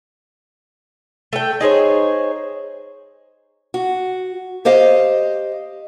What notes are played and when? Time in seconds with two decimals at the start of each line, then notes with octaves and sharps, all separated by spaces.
1.33 A3 G5
1.61 D#4 G#4 C5 C#5
3.74 F#4
4.65 G4 C5 D#5 F5